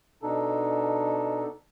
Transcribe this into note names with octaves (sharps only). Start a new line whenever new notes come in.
B2 D4 D#4 A4